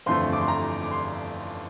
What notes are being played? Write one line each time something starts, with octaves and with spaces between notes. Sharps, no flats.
G1 F2 E3 A3 C6
D6
C6
A#5
D6
C6